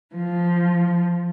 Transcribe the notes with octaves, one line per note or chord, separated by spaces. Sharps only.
F3